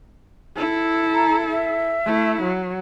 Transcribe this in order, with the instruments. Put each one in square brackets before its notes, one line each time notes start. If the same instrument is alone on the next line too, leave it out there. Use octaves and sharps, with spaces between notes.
[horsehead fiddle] E4 A4
[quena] A#5
E5
[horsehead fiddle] A3 E4
F#3